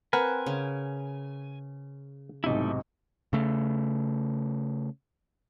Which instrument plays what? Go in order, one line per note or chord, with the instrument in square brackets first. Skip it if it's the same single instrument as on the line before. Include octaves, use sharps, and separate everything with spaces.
[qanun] C4 [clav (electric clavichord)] A#4 B4 F#5 [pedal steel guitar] G#5
[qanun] C#3
[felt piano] B1 G#2 C3 [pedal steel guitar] A3 D#4 E4
[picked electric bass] C#3 A3